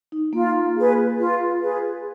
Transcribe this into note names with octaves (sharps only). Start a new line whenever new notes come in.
D#4
A#3 F4
G#4 B4
F4
G#4 B4